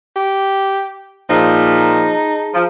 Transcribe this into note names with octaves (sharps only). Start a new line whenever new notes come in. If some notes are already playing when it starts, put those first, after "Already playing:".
G4
A#2 F3 D#4 G#4 A5 A#5
F3